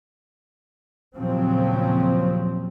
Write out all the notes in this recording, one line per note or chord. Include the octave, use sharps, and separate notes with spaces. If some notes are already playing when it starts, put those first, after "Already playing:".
D#2 A#2 C#3 F3 F#3 C4